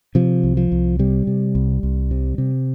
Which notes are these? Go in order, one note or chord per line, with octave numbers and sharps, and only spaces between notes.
C3 F3
C2
F3
C2
C3 G3
C3
C2
C2
C3
C3